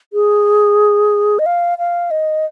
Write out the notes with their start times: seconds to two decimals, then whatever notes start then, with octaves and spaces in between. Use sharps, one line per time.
0.13 G#4
1.39 D#5
1.46 F5
1.78 F5
2.11 D#5